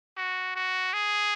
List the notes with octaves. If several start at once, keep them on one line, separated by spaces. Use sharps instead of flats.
F#4
F#4
G#4